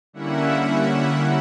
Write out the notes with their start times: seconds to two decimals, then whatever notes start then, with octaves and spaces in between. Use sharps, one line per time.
0.13 D3 G3 A#3 C#4 E4 E5 F#5